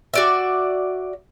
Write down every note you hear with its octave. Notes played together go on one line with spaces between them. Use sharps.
F#4 D5 E5